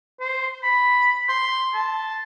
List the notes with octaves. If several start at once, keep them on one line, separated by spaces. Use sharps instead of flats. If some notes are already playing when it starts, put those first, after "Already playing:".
C5
B5
C6
A5